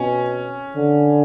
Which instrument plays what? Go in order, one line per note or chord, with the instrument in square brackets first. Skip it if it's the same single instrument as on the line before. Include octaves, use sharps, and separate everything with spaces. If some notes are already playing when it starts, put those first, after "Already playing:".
Already playing: [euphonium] B2 [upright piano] C#4
[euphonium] D3